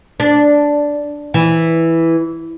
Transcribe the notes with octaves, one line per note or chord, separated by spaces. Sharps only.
D4
E3